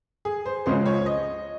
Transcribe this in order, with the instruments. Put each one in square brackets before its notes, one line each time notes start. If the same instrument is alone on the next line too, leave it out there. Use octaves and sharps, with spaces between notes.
[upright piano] G#4
C5
[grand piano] C#2 C#3 F3 G#3 C#4 [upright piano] C5
[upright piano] C#5
D#5